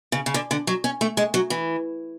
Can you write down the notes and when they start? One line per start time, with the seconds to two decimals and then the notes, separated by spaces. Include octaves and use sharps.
0.12 C#3
0.26 C#3
0.34 D3
0.51 D3
0.67 F#3
0.84 C#4
1.01 A3
1.17 G#3
1.34 F#3
1.50 E3